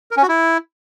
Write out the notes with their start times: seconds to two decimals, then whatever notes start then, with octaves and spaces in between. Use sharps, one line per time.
0.11 A#4
0.17 C#4
0.23 F#4
0.28 E4